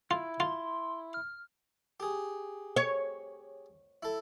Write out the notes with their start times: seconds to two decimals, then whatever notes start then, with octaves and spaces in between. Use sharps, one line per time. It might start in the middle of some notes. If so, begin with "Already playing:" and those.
0.11 E4 F4
0.40 F4 C6
1.14 F6
2.00 G4 G#4
2.76 C#5
4.03 E4 A4